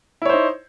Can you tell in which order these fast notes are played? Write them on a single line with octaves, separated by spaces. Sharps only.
E4 C#5 C5 D#4